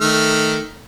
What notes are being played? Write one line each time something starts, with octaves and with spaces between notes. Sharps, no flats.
D#3 A3 F6